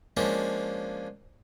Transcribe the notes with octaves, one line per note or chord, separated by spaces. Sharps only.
F3 G#3 A#3 C#4 D4